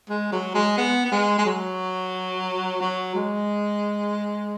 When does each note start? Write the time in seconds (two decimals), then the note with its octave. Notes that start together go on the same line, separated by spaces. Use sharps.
0.09 G#3
0.32 F#3
0.55 G#3
0.77 B3
1.05 B3
1.12 G#3
1.38 G#3
1.46 F#3
2.81 F#3
3.15 G#3